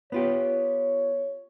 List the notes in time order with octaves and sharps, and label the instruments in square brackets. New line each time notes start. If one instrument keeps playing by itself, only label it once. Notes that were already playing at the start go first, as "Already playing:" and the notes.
[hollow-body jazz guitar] B3 F4 G4 [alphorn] C#5